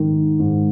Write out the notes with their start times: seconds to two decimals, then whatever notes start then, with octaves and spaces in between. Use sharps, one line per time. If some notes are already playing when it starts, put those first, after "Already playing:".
Already playing: G#2 D#3
0.39 G#2